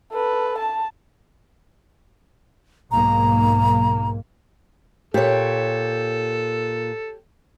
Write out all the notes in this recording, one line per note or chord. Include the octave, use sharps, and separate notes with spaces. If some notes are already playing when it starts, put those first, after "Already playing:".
A4 B4
A5
B1 G#2 A#3 A#5
A#2 G4 A4 C#5